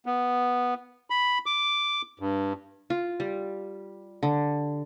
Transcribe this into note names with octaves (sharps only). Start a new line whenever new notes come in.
B3
B5
D6
G2
F4
G3
D3